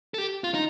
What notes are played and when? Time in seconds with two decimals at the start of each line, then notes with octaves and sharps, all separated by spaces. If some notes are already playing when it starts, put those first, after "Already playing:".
0.14 A4
0.18 G4
0.44 F4
0.54 D#4